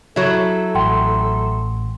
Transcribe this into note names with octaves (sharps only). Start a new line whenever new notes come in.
F#3 E4 A4
A1 F#5 G5 C6